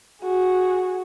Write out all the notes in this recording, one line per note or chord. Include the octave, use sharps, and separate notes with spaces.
F#4 G#4